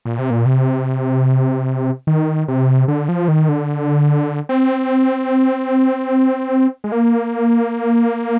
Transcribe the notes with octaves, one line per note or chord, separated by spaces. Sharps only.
A#2
C3
A#2
C3
D#3
C3
D3
F3
D#3
D3
C4
G#3
A#3